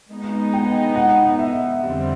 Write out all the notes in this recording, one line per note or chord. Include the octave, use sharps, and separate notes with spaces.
G#3 B3 D#4
G5
F#5
E5
F2 D3 G3 C4